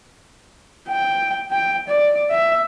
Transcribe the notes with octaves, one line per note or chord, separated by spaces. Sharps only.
G5
G5
D5
E5